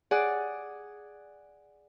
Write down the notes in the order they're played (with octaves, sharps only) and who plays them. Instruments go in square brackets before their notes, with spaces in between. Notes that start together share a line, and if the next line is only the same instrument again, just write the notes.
[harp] G#4 D5 F#5